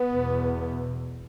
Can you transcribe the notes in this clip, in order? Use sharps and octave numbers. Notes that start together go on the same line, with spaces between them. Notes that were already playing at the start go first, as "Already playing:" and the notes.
Already playing: B3
E2 B2